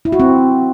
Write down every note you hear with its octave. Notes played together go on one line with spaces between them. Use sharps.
E4
F#4
C4